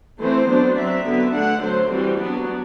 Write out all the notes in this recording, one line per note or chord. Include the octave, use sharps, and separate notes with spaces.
E3 A3 C4 C5
F#3 B3 D4
F#3 C4 E5
D3 F#3 B3
D3 A3 D4 F#5
D3 F#3 A3 C5
E3 G3 C4 F#4
F#3 B3 D4